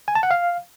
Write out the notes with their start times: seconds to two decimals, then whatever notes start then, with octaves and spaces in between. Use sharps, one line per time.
0.08 G#5
0.15 A5
0.23 F#5
0.31 F5